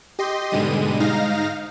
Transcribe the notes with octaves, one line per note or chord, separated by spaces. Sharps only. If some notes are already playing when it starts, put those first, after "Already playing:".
G4 D#5 C6
G#2 B2 D3 G3 G#3 D#7
G#2 D#4 F5 A#6